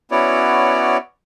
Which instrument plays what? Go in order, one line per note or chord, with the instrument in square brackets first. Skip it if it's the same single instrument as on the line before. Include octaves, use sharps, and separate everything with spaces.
[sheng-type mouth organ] B3 C#4 E4 F#4 C#5 D5